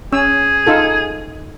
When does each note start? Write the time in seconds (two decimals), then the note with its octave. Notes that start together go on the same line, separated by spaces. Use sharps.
0.12 C#4 G#4 E6
0.67 D#4 F4 A4